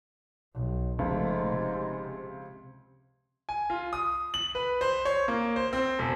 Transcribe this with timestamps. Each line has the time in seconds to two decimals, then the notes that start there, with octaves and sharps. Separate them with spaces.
0.54 B1
0.99 F1 C#2 G#2 F3 A3
1.47 C3
3.49 G#5
3.70 F4
3.93 D#6
4.34 F#7
4.55 B4
4.81 C5
5.05 C#5
5.28 A#3
5.56 C5
5.73 C4
5.99 E1